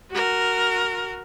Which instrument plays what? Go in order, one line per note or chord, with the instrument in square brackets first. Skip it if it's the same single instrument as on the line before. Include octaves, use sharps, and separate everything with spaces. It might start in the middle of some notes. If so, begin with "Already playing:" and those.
[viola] F#4 A#4